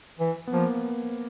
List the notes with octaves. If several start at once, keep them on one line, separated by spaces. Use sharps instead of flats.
E3
B3
F3 A#3